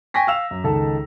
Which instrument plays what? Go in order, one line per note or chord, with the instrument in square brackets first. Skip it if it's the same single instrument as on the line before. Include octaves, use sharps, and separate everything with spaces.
[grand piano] G5 G#5 C#6 A#6 B6
F5 E6 F7
F#2
C#2 D#3 A4 A5